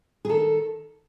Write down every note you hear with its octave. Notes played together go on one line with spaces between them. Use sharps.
G#4
D#3 A4